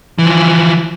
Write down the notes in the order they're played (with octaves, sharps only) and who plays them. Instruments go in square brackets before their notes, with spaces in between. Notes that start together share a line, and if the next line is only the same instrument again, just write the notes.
[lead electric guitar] E3 F3